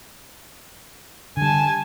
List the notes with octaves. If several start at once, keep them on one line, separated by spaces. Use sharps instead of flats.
D3 G3 G#5 A5